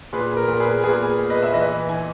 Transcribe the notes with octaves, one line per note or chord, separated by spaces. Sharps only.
A#2 G#4 B4
A#4
A#2
G#4 B4
A#2 G#4 B4
A#2
B4 D#5
E5
E3 B4 D#5
E3 G#5